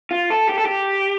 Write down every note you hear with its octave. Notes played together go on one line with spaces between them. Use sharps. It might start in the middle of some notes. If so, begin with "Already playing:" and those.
F4
A4
G4
A4
G4